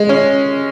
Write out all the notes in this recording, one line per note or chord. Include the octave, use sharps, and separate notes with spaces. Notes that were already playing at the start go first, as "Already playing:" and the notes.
Already playing: G#3
C#4